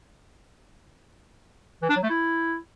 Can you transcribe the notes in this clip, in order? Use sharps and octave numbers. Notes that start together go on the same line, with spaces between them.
E3
D4
F#3
A3
E4